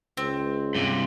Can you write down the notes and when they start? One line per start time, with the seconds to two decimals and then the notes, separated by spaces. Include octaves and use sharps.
0.17 C#2 C4
0.75 G2 C3